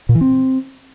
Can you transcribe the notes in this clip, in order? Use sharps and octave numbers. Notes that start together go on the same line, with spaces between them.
A#2
E3
C4